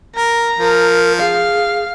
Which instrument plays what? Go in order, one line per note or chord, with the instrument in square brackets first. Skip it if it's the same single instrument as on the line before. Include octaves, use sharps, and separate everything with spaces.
[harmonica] A#4 [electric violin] A#5
[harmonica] F3 [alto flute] A#4
[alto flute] G#4 [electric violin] F5